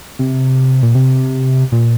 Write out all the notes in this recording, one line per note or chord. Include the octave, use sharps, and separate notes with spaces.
C3
A#2
C3
A#2